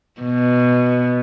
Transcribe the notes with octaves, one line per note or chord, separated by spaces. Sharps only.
B2